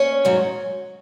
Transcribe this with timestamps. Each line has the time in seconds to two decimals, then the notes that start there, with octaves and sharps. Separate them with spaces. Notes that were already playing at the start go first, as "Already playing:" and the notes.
Already playing: C#4 C#5
0.25 G#2 F#3